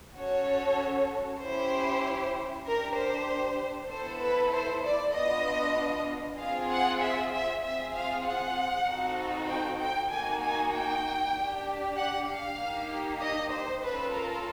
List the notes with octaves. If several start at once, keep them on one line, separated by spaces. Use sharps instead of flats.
C#4 F#4 A4 C#5
C#4 E4 G4 C5
D4 G4 A#4
C5
B3 E4 A4 C5
B4
C5
D5
B3 D4 F4 D#5
C4 F4 G#4 F5
F#5
E5
E5
C4 F4 G#4 E5
F5
F#5
C4 D#4 F#4 A4
G5
G5
A#3 D#4 F#4 G#5
G#5
G5
D4 G4
F#5
F5
A#3 D#4 G4
D#5
C5
C#4 F4 A4 B4
A#4